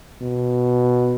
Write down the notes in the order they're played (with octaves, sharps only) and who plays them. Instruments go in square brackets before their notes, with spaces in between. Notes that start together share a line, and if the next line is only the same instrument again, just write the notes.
[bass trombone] B2